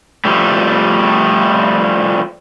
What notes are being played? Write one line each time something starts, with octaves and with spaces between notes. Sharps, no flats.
F3 G3 A3